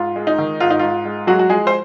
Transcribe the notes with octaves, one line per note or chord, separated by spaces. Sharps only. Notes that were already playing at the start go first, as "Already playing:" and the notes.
Already playing: G#2 F4
G#3
D#4
D#3
G#2 F4
D#4
G#2 F4
G#3
F#3 G#3 F#4
F#4
F3 G#3 G#4
C5